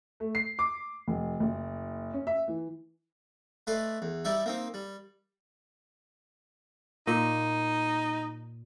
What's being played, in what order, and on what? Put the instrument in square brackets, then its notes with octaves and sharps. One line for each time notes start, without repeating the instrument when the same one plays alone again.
[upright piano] A3
C7
D6
F1
F#1
C#4
E5
E3
[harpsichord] A3 B4 D5 D#5 C6
E2
G3 D#4 E4 D5 E5
A#3 C4 D#4
G3
[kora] A#2 [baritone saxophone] D#4